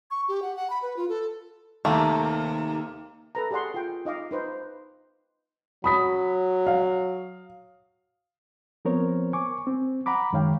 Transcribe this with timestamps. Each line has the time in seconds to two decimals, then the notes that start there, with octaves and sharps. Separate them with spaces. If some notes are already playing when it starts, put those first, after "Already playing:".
0.11 C#6
0.28 G4
0.42 F#5
0.56 F#5
0.70 B5
0.82 B4
0.97 F4
1.09 A4
1.85 D#2 C3 A3 A#3
3.35 A4 B4 A#5
3.51 G4 G#4 D5 F#5 C6
3.74 F4 G5
4.05 D#4 D#5 F5 D6
4.31 D#4 B4 C5
5.84 F#3 B5 D#6 B6
6.67 F5
8.85 F3 B3 C4 A#4 C5 C#5
9.33 G#5 C#6 D6
9.67 C4
10.06 F#5 A#5 B5 D6
10.33 F#2 D#3 G#3 C#5 F5 G5